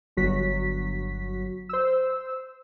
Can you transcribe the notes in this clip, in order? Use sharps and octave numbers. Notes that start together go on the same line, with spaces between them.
G1 F#3 F#4 B6
C5 E6